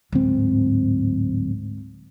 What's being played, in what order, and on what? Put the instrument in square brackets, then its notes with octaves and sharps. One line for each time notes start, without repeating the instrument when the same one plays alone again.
[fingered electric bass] D1 C4 [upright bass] G#2